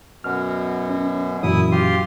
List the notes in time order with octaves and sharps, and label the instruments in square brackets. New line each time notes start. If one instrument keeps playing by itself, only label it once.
[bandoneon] F#2 B2 [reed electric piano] F6
[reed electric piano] C#4
[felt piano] F#2 [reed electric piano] A#2 E3 [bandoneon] E4 D#6
[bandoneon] F4 G4 C6